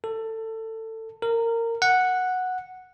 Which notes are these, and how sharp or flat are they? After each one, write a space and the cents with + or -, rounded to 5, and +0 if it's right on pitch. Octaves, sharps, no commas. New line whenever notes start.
A4 +20
A#4 -20
F#5 -5